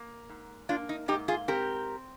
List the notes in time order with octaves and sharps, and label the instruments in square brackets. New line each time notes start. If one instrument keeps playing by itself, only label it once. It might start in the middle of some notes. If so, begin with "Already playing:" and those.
Already playing: [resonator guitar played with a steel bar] A#3
G#2
A#3 D4 F4
D#4
G#2 D#4 G4
F4 G#4
C4 G4 A#4